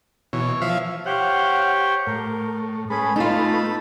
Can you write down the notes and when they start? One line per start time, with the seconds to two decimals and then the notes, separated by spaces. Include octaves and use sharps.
0.33 B2 E3 C#5
0.61 F3 E5 F5
1.06 G4 C5 C#5 F5 F#5
2.07 A2 A#4
2.90 G#3 C#4 G#4 A4 B4 B5
3.16 A3 B3 D#4 F4 A4 A5 B5